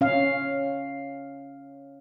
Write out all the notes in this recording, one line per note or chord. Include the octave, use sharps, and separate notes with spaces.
C#4 F5